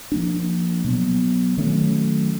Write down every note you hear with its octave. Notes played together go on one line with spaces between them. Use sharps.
F3 A#3 D4
B2 F#3 B3
D#3 F#3 A3 C#4